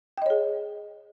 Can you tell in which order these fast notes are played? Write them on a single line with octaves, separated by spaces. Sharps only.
G5 D#5 C#5 G#4